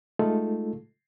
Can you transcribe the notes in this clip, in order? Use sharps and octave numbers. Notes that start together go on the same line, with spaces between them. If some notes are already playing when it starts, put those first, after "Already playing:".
G#3 A3 D#4 F4 A4